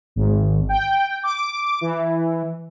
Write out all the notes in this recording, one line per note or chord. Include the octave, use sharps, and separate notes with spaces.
G#1
G5
D6
E3